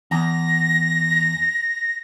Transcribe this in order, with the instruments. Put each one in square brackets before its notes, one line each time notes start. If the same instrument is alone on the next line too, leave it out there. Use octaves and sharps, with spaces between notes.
[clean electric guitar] E2 [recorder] A#6